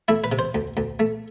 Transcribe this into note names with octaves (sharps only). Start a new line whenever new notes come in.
A3 E4
B4
C3
C5
D2
D2
A3